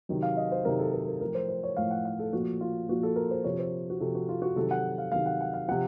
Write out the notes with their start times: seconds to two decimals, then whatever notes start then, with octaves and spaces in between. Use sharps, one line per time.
0.09 C3 D#3 F#3
0.23 F5
0.37 D#5
0.52 C5
0.65 C3 D#3 F#3 A#4
0.80 A4
0.94 A#4
1.07 A#4
1.21 A2 F3 A#4
1.35 C5
1.49 C5
1.63 C#5
1.77 A2 F3 F5
1.91 F#5
2.05 F5
2.19 A4
2.33 A#2 F3 F#4
2.61 F4
2.89 A#2 F3 F#4
3.03 A4
3.16 A#4
3.31 C5
3.44 C3 F3 C#5
3.59 C5
3.90 F#4
4.00 C3 F3 A4
4.15 F#4
4.29 F4
4.42 F#4
4.56 C3 D#3 F#3 A4
4.71 F#5
4.98 F5
5.12 C3 D#3 F#3 F5
5.26 F#5
5.41 F#5
5.53 F5
5.68 C3 F3 F#5